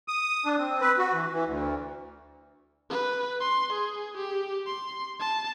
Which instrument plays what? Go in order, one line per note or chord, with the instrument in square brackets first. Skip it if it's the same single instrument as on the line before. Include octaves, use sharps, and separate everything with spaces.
[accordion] D#6
D4
C4
B4
F#4
E3
E3
D2
[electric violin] B4
C6
G#4
G4
C6
A5